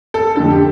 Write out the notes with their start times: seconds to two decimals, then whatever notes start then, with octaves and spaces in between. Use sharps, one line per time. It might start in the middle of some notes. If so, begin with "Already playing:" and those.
0.14 A4
0.36 F2 D3 A4
0.50 G4